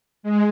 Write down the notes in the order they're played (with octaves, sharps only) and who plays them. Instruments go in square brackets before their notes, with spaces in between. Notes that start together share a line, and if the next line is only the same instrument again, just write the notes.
[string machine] G#3